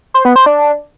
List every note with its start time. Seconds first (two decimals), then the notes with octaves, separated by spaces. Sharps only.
0.14 C5
0.25 B3
0.36 C5
0.46 D4